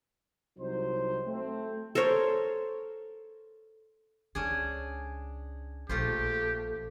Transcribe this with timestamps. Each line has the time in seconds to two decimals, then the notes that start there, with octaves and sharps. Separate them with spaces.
0.58 C2 F#3 D#4 C5
1.27 A3 C4
1.95 A4 A#4 C5 C#5
4.35 C#2 G#3 C#4 D4 G#4
5.89 A#1 A3 F4 G4 C5